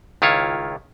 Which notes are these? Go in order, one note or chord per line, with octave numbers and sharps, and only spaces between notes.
C#2 D#3 E4 F4 C#5